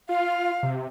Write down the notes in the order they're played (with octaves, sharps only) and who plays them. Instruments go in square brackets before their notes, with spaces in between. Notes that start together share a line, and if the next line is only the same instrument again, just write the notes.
[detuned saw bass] F4 [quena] F5
[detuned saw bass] C3